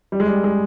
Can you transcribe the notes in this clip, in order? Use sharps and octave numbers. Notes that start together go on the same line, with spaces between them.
G3
G#3
G3
G#3